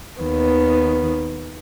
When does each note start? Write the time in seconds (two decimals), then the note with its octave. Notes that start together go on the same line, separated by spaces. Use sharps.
0.21 D#2 D#3 B3